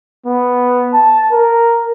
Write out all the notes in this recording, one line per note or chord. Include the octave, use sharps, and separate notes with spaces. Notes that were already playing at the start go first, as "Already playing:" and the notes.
B3
A5
A#4